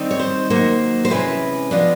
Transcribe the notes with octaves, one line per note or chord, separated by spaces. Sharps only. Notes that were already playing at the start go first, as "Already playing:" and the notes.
Already playing: D#3 G3 C4 D#4
C#5
C5
D#3 F#3 A#3 C5
C5
C3 E3 G#3 C#4 B4
F3 G#3 B3 D4